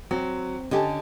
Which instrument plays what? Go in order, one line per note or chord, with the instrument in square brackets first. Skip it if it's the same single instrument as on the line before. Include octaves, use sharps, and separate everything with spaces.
[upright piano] F#3 [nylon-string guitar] C4
[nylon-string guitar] D3 C#4 G4 [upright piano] D#5 G#5 A5